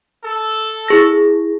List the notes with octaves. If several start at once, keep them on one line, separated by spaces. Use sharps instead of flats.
A4
E4 G#4 A#6